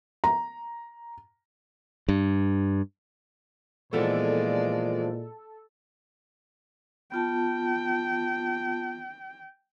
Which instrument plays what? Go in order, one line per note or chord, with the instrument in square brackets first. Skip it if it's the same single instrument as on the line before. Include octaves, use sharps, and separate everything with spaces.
[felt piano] A#5
[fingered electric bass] G2
[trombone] A#2 [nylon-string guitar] E3 F3 B3 [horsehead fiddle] G#3 D5 [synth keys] A4
[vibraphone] B3 F4 A5 [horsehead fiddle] G5